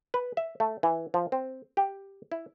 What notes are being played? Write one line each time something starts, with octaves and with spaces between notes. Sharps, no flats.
B4
E5
A3
E3
F3
C4
G4
E4